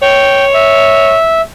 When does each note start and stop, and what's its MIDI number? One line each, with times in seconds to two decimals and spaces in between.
0.02 1.16 73
0.02 0.45 79
0.54 1.41 76